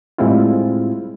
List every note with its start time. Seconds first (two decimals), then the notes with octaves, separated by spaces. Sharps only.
0.18 A2 G3 G#3 C4 E4 F4